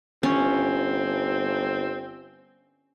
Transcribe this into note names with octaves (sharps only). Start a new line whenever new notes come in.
G1 C4 C#4